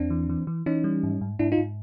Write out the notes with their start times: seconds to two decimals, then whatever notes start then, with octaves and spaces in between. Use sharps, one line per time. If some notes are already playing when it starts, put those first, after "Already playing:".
Already playing: E2 C4 D4
0.10 E3
0.29 E3
0.47 E3
0.66 E3 C#4 D#4
0.84 G3
1.03 G#2
1.21 G#2
1.39 G#2 D4 E4
1.52 D#4 F4
1.58 G#2